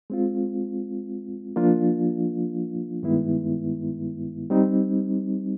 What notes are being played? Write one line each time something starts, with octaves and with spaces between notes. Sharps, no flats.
G#3 C4 F4
F3 A#3 D4 F4
G2 D#3 G#3 B3 E4
G3 C4 D#4